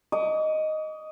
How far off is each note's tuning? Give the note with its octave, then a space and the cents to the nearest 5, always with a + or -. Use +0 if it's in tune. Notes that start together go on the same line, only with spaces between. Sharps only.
D#5 +0 D6 -45